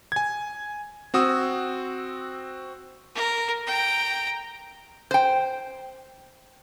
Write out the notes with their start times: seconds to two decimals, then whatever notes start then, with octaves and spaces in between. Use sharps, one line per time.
0.12 G#5 G#6
1.14 C4 F#4 D#6 E6
3.15 A#4
3.67 G5 A#5
5.11 C5 G5